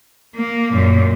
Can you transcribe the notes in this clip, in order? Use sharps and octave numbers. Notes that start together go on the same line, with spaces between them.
A#3
F#2 A#2